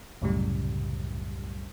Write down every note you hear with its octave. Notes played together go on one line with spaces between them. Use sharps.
C2 F#2 A2 C#3 G3